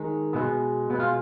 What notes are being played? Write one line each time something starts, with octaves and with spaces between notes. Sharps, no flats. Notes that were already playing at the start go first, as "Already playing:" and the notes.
Already playing: D#3 G#3
B2 G#3 B3
B2 B3
G#3 F4